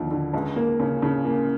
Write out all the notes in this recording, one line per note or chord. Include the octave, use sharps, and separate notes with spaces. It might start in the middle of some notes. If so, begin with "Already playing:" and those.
Already playing: D#2 D3 F3
D3
C#2
A#3
C#3
C#3
A#3